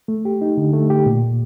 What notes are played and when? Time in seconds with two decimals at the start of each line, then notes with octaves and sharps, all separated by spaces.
0.08 A3
0.25 G4
0.41 D#4
0.57 D3
0.73 A3
0.90 G4
1.06 A#2